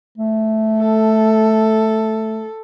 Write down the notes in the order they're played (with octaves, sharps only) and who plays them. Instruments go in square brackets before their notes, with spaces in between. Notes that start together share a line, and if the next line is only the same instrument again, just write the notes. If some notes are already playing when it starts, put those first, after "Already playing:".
[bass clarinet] A3
[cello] A4